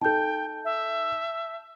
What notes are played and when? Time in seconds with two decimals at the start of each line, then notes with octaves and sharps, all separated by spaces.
0.01 D#4 A4 G5 A5 G6
0.65 E5